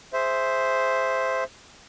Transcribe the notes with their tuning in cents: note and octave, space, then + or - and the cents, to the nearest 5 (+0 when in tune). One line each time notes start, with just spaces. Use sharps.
G#4 +0 C5 +0 E5 +0